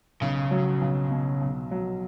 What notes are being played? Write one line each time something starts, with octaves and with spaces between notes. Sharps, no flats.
B1 C#3
F#3
B1
B2
B1
F#3